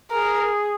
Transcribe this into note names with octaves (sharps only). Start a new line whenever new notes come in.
G#4 A#4